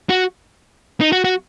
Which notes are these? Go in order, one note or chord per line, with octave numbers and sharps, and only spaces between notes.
F#4
D#4
F#4
F#4